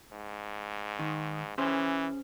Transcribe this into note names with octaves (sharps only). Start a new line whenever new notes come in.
G#2
D#3
E3 C#4 G#4 C5